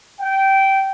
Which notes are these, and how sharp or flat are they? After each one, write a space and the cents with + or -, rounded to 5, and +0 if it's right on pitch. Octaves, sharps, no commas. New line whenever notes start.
G5 -15